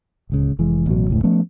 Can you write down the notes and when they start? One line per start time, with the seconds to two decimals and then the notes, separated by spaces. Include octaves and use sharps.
0.30 D1 C#2 C#3
0.59 F1 E3 G#3
0.86 A1 B2 E3 F#3
1.08 F1 C#2 A2
1.23 F3 A3 B3 C#4